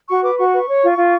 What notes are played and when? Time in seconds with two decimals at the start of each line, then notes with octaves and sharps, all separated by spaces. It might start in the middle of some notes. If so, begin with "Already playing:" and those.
0.09 F#4 C#6
0.23 B4 D6
0.37 F#4 C#6
0.52 B4
0.69 C#5
0.82 F4
0.97 F4